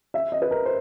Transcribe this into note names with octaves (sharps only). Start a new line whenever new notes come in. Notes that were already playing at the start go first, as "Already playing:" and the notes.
E5
D#5
B4
A#4
C5